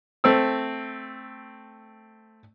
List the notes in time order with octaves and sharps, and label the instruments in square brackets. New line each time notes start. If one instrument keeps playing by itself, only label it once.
[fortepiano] A3 C4 E6